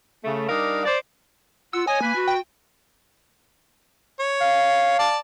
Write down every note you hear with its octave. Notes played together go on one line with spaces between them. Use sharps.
C#3 A3
G3 D4 D#4 A#4 F5
C5 D5
F4 F#5 E6
C#5 D#5 G#5 D#6
A#3 B4 B5
F#4
G5
C#5
F5
D5 A5